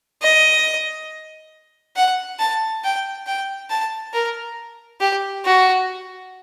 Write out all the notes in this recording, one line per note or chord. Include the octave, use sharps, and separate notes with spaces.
D#5
F#5
A5
G5
G5
A5
A#4
G4
F#4